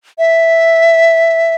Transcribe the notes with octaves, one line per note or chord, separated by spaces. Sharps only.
E5